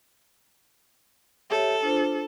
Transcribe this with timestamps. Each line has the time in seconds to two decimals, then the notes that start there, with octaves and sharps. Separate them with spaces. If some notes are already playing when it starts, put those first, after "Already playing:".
1.50 G4 A4 C#5 E5
1.82 D4 F4 C5